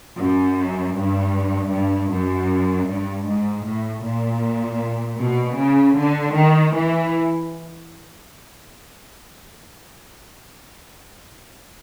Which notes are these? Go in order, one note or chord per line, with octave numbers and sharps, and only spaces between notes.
F#2
G2
G2
F#2
G2
G#2
A2
A#2
B2
C#3
D3
D#3
E3